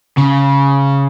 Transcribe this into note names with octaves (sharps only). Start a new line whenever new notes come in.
C#3